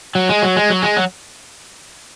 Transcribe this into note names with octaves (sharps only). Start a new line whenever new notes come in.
F#3
G#3
F#3
G#3
F#3
G#3
F#3